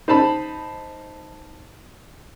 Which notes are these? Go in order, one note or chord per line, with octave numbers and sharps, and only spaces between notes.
D#4 C5 A5 B5